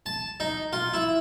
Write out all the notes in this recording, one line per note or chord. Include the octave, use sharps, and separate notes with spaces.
A5
D#4
F4
E4